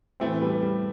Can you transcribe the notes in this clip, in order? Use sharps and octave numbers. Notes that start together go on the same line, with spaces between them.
A2 E3 A3 C4
G3 B3
G3